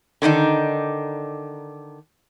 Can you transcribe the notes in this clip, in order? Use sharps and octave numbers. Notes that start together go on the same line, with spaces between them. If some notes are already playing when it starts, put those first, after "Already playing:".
D3 D#3 D4 D#4